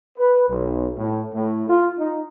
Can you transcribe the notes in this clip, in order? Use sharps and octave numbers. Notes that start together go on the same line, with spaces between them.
B4
B1
A2
A2
F4
D#4